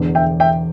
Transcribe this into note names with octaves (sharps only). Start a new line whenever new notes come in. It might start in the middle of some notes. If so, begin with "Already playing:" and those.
Already playing: E1 E2 D3
E5 G5
E5 G5